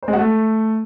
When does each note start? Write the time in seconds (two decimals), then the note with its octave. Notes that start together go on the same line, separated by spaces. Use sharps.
0.03 C5
0.08 G#3
0.13 F#4
0.18 A3